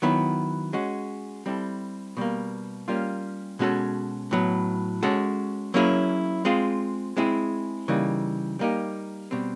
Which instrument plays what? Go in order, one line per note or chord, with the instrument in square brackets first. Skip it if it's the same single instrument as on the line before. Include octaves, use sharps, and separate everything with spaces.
[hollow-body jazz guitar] D#3 F#3 B3 E4
G#3 C#4 F#4
G3 C4 E4 A4
B2 G3 A#3
G3 A#3 C#4 F4
B2 G#3 C#4 F#4 A4
A2 F#3 B3
G#3 C#4 F#4 A4
F#3 A#3 C#4 E4 G#4
G#3 C4 F4 G#4
G#3 C4 E4 G#4
C#3 E3 G3 A#3 D#4
G3 A#3 D#4 G4
B2 G3 C4